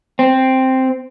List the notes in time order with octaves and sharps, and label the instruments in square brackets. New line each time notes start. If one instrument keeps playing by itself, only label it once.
[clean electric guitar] C4